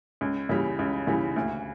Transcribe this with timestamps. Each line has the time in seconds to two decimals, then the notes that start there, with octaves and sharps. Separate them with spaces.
0.21 C#2
0.49 C#3 E3 G3
0.79 C#2
1.07 C#3 E3 G3
1.36 D2